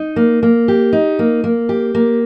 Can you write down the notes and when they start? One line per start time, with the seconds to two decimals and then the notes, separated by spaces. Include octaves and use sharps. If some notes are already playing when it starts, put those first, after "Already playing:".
Already playing: D#4
0.16 A#3
0.43 A#3
0.68 G4
0.93 D#4
1.19 A#3
1.44 A#3
1.69 G4
1.95 A#3